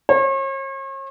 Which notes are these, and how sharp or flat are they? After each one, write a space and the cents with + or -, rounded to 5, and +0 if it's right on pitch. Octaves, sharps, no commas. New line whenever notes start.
C#5 -40